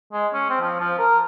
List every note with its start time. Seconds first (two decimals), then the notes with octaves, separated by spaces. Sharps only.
0.13 G#3
0.33 C#4
0.50 C4
0.61 F3
0.80 F3
0.99 A#4